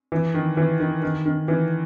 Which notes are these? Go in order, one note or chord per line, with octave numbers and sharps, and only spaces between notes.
E3
D#3
E3
D#3
D#3
D#3
E3